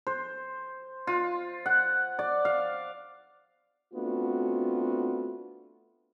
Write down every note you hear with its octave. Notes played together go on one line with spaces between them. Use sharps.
C5
F4
F#5
D5
F5
A3 B3 C4 D4 F4 F#4